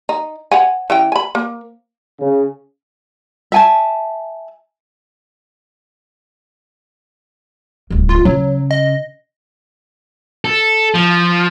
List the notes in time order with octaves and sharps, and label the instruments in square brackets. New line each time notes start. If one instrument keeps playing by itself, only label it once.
[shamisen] D#4
C#5 F#5 G#5
E3 C#4 G5
G#5 B5
A#3
[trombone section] C#3
[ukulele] E5 G#5 A5
[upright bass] D1 C2
[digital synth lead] F4
[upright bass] C#3 [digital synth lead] F#3
[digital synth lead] D#5
[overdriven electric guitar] A4
F3